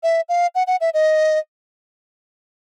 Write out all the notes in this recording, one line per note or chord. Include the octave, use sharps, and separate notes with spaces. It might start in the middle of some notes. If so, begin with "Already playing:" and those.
E5
F5
F#5
F#5
E5
D#5